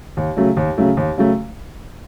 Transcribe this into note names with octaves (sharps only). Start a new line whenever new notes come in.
D#2
C#3 F#3 A3
D#2
C#3 F#3 A3
D#2
C#3 F#3 A3